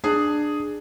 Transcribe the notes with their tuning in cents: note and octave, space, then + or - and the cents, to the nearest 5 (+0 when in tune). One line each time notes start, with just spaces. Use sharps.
D4 +15 G#4 +0